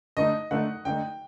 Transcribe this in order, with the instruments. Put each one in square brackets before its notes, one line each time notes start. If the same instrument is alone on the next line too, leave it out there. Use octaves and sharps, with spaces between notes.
[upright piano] D3 A3 D#4 [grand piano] D#5
[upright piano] D3 A3 D#4 [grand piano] F#5
[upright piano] D3 A3 D#4 [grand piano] G5